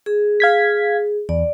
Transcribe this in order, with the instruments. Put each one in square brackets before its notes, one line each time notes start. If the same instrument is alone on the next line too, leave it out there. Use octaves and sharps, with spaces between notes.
[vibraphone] G#4
[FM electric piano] F5 G#6 B6
[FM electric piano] E2 [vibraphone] D5